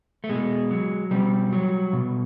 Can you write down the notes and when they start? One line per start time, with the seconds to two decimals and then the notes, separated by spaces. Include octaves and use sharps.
0.24 A3
0.29 B2 G#3
0.71 F#3
1.11 B2 G3
1.52 F#3
1.93 B2